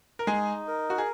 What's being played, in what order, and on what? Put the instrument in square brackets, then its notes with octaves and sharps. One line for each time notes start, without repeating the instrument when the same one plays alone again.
[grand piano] A#4
[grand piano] G#3 G#4 [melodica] D#4
[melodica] A#4
[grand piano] F#4
G#4